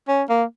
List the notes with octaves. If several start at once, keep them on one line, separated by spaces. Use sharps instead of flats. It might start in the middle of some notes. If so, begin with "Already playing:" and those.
C#4
A#3